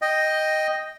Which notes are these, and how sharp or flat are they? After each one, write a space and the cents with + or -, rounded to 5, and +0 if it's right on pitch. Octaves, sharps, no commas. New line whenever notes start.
D#5 +0 G5 +0